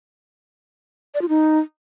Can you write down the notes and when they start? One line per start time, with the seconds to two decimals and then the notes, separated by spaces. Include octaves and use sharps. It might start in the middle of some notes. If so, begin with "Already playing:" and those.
1.14 D5
1.22 F4
1.29 D#4